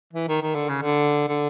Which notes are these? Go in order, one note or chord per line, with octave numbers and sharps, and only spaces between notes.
E3
D#3
D#3
D3
C#3
D3
D3